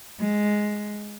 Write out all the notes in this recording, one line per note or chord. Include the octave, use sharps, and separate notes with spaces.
G#3